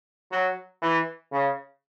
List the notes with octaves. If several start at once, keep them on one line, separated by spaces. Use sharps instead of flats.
F#3
E3
C#3